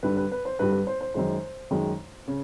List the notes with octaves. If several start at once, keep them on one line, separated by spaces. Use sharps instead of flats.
G2 D3 G3 B4
B4
B4
C5
G2 D3 G3 B4
B4
C5
C5
F#2 D#3 G#3 C5
F#2 D#3 G#3
C#3